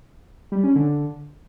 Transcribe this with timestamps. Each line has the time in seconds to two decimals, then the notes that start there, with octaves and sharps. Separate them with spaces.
0.52 G3
0.64 C#4
0.75 D3